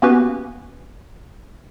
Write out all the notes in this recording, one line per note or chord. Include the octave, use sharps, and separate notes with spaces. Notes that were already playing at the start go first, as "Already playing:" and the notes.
A#3 B3 C#4 F#4 G4 B4